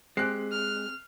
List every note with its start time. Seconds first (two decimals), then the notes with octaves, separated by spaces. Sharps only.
0.17 G#3 C4 G4 G#4 F#6 C7
0.52 F6